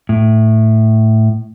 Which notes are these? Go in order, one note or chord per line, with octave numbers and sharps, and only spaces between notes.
A2